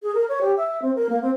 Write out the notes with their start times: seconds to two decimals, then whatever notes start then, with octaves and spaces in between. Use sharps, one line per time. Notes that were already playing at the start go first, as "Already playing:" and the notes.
0.03 G#4
0.14 A#4
0.29 C#5
0.41 G4
0.57 E5
0.82 C4
0.95 A#4
1.09 A#3
1.22 C4